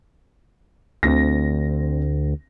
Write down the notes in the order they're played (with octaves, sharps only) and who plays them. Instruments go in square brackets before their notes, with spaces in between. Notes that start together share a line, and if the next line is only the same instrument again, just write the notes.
[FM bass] D2 [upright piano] C4 D4 A#6